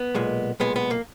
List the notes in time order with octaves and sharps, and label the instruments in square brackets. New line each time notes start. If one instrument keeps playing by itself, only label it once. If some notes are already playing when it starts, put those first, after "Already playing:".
Already playing: [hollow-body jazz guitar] B3
B1 A#2 G#3
B1 A#2 G#3 B3
B3
A#3